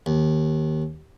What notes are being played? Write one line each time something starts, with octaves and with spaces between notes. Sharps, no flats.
D#2